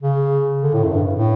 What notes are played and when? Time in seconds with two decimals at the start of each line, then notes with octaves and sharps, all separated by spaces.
0.02 C#3
0.63 D3
0.74 A2
0.84 F#2
0.94 G2
1.14 A2